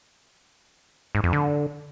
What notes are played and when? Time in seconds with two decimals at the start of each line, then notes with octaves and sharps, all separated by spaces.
1.15 G#2
1.24 F2
1.33 D3